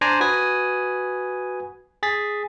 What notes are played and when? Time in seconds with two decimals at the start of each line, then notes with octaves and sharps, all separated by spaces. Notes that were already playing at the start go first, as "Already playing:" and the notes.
0.01 D4 C5 D5 G#5 A#5
0.20 F#4 B4 G#5 D#6
2.03 G#4 A6 B6